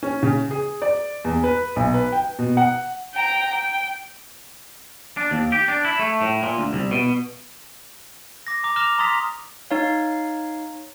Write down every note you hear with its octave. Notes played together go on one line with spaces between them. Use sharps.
C#4
C#3
G#4
D5
E2
B4
B1
B4
G5
B2
F#5
G5 A#5
G5
D4
D#2
G4
D4
E4
A3
A2
A#2
D2
C2
B2
D6 A#6
A#5 D6
D6 F6 A#6 E7 F7 G7
A#5 C6 D#6 A6 B6
D#4 C#5 F5